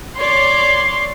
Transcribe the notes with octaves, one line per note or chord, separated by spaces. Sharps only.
C#5 D5 C6